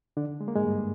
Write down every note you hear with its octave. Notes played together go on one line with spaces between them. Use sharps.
D3 D4
G#3
A#3
G#2 G#3
G2 G3